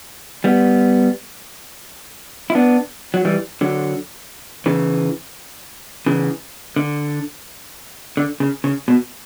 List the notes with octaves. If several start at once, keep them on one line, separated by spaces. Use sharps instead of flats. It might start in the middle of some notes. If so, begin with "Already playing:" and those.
G3 B3
E4
B3 D4
F#3
E3 G3
D3 F#3
C#3 E3
C#3 E3
D3
D3
C#3
C#3
B2